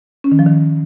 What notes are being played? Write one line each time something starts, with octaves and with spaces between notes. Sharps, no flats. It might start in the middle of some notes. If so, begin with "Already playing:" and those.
C#4
D#3
F3
D#3